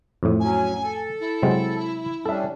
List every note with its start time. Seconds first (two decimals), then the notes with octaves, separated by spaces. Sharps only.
0.23 F2 A2
0.40 F#3 C#4 G#5
0.83 A4
1.20 E4
1.43 C3 F#3 G#3
2.26 G3 C#4 D4 A4 E5